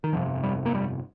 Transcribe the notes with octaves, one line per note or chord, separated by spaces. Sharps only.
D#3
G1 F2 C3 F3
G3
A#3
G3